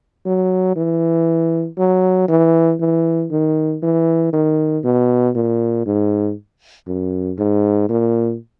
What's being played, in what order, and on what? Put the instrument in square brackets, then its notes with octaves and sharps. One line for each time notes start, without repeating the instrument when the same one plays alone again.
[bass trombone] F#3
E3
F#3
E3
E3
D#3
E3
D#3
B2
A#2
G#2
F#2
G#2
A#2